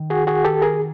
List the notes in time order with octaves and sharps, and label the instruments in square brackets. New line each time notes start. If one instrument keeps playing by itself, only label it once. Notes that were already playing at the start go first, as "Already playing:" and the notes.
Already playing: [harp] D#3
[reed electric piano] F#4 G#4
F#4 G#4
G4 A4
G#4 A#4